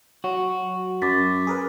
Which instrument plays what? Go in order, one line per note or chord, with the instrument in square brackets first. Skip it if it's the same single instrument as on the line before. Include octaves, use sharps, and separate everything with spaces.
[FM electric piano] F#3 [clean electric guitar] F#4
[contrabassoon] F#2 [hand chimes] D6 A6 B6
[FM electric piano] G#4 A#4 B4